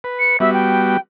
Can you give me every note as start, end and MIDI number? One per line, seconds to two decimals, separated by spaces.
0.04 0.37 71
0.19 0.40 97
0.40 0.97 55
0.40 0.97 59
0.40 0.97 66
0.40 0.52 76
0.54 1.00 79